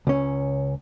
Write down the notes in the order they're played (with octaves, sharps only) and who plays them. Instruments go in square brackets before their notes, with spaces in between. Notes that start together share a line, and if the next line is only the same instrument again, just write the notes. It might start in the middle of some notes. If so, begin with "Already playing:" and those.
[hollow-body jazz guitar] C#2 C#4